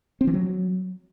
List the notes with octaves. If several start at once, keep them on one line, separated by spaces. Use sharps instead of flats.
C4
E3
F#3